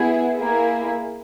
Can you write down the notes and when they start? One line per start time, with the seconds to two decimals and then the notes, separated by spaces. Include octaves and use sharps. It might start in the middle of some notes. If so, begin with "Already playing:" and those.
Already playing: B3 E4 G#4
0.37 A#3 E4 G#4